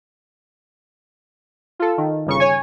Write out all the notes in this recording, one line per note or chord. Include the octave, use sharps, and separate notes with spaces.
F4 A4
D#3
G1 C#3 C#6
C#5 G#5